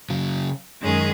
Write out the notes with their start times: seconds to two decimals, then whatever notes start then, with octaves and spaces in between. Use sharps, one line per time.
0.10 C#3 F#3
0.82 F#2 D#3 G#3 C#4 G#4